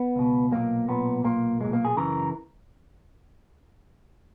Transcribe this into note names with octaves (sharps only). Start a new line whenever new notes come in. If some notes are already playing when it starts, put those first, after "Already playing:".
Already playing: B3
C#2 B2
B1 A#2 A#3
B1 A#2 B3
B1 A#2 A#3
B1 A#2 G#3
A#3
G#4
F#2 C#3 E3 A#4